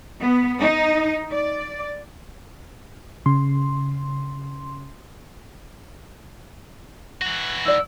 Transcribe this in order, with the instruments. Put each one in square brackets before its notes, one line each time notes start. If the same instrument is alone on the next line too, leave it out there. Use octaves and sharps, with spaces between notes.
[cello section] B3
D#4
D5
[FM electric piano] C#3 C6
[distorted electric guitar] E3 F#4
[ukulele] D#4 D5 [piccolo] E6